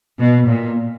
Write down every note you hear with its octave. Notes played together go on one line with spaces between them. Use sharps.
B2
A#2